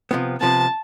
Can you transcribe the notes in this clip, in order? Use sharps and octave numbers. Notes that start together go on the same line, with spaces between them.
C3 F3 B3
C3 F3 B3 A5